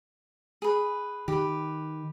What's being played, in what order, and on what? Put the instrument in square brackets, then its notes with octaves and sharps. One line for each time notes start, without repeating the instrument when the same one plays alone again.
[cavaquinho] G#4 B4
[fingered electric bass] D#3 [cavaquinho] G4 B4